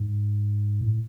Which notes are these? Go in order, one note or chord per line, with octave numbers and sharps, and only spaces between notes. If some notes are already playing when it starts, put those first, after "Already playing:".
Already playing: G#2
A2